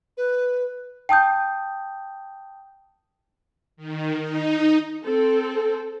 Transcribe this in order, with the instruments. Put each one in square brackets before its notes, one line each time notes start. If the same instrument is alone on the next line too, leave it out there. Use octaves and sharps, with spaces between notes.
[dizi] B4
[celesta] G5 A5 D#6 G6
[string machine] D#3
D#4
[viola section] C4 A4